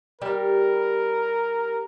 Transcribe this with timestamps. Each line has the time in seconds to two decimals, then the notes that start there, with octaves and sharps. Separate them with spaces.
0.22 G3 A#4